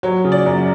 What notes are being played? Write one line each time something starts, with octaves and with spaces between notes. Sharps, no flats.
F#3 C#5
C#3
D5
F#2